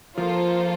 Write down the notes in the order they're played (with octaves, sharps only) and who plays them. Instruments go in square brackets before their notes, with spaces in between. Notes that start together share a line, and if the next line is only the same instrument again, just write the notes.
[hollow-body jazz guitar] F3 [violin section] A#3 F4 A4 C5